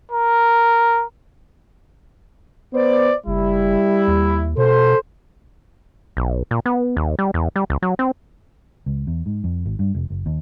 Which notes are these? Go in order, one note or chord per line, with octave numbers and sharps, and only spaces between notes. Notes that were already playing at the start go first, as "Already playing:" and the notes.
A#4
B3 C5 D5
F#1 G3 E4
D#2
B2 A4 C5
B1
A#2
B3
D#2
G3
E2
G3
C#2
F#3
C4
C#2
E2
G#2
F2
G#1
G2
F1
F#1
D#2